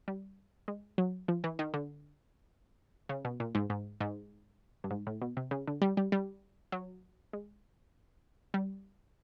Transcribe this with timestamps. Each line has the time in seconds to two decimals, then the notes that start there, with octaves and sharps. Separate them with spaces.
0.08 G3
0.68 G#3
0.98 F#3
1.28 F3
1.44 E3
1.59 D#3
1.74 D3
3.09 C#3
3.25 B2
3.40 A#2
3.55 G#2
3.70 G#2
4.01 G#2
4.84 G2
4.91 G#2
5.07 A2
5.22 B2
5.37 C3
5.51 C#3
5.67 D3
5.82 G3
5.97 G3
6.12 G3
6.72 F#3
7.33 G#3
8.54 G3